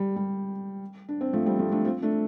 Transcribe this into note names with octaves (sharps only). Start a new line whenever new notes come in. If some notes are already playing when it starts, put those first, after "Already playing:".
Already playing: G3
G3
D4
C4
F3 A3
G3 C4
F3 A3
A3 D4
C4 F4
A3 D4